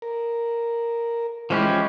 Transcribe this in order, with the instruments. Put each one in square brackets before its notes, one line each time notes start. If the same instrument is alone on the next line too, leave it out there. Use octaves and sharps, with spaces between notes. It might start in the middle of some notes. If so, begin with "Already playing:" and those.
[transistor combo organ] A#4
[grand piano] E3 G#3 E4 [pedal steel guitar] F3 C#4 G4